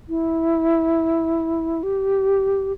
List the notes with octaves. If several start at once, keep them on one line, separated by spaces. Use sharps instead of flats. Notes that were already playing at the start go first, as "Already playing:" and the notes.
E4
G4